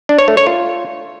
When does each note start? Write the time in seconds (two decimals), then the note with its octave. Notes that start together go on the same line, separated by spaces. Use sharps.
0.09 D4
0.19 C#5
0.28 A3
0.37 C#5
0.46 F4